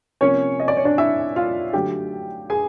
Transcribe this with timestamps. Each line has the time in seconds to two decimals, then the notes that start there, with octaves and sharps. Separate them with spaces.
0.21 C3 F3 A#3 C#4 C#5
0.60 D#5
0.68 D5
0.77 C#5
0.85 D4 D5
0.98 E4 E5
1.36 F4 F5
1.73 D3 F#3 A3 G4 G5
2.50 G#4 G#5